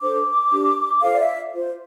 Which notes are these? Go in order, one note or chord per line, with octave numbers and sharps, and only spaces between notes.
D4 A4 C5 D6
D4 G4 A#4
F4 A4 C5 F5
D5
E5
F4 C5